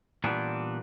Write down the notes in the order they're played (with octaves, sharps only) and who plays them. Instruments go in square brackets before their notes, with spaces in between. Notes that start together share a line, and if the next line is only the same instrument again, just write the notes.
[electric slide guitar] A#2 E3 G3 B3 D4